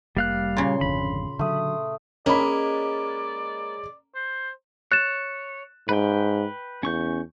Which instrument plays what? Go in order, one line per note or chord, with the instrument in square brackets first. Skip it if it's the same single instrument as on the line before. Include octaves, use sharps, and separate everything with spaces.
[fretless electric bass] F1 A#3 [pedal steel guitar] G3 F5 F#6
[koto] A#2 C#3 [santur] C6
[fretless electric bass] G#1 F2 D3 [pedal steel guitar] B5
[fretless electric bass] D3 F#3 [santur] A3 D#6
[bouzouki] G#3 [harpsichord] A#3 [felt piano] C#4 B5 [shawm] D5
[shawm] C5
[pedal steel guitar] C#5 [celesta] F#6 A6 E7
[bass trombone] G#2 [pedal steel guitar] B4 G5
[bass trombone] E2 [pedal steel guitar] C#4 C#6 G6